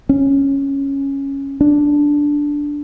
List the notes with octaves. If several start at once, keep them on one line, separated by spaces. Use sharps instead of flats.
C#4
D4